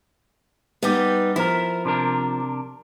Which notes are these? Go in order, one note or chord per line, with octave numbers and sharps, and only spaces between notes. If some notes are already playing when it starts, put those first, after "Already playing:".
G3 B3 D#4 G4
F3 E4 A#4
C3 D4 A#4